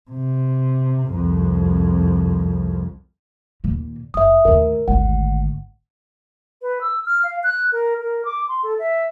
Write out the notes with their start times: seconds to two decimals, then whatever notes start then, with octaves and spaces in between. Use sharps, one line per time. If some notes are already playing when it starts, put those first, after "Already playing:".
0.11 C3
1.08 C2 F2
3.64 D#2 A#2
4.14 F#1 E5 D#6
4.45 D#2 A2 A#4
4.88 G#1 D2 F#5
6.62 B4
6.81 E6
7.06 F6
7.23 F5
7.43 F#6
7.72 A#4
8.02 A#4
8.25 D6
8.48 C6
8.63 A4
8.79 E5